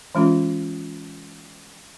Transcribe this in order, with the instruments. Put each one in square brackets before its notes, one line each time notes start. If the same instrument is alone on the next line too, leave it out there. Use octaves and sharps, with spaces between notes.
[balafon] E3 G#3 C#4 F4